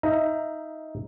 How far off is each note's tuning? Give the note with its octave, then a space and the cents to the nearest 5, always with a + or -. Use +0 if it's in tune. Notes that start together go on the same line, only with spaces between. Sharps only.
D#4 +15 E5 +25 A#5 +0